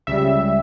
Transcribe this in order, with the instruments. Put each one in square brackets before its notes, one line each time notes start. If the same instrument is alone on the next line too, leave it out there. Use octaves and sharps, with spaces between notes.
[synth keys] C#2 C#3 G3 E5